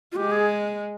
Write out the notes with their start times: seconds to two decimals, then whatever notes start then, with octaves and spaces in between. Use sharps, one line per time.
0.12 F4
0.16 G#3 G4
0.31 G#4